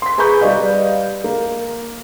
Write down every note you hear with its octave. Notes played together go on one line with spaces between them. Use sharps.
C6 B6
G#4 B4 A#5 B5 C#6 G6
G3 B4 D5 D#5 F5
A#3